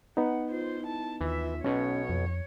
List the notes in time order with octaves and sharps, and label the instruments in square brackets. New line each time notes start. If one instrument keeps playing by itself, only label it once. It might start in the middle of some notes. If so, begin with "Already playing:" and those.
[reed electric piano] B3 D#4 [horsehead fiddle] F#5
[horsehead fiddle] F4 C5
E4 A5
[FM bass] D#2 [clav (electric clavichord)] E3 [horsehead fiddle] F4 E5
[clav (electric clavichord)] B1 B2 [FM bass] C#4 [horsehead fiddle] C#5
[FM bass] F2